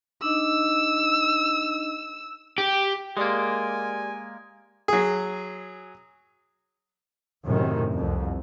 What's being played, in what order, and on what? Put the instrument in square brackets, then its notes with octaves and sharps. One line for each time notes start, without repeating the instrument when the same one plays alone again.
[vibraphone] D4 D#4 D#5 [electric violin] E6
[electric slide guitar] G4
[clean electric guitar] G#3 A#3 [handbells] G4 D5 C6 [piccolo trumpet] G#5
[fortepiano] F#3 G#4
[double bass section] F#2 A2 C3 D#3
C2 F2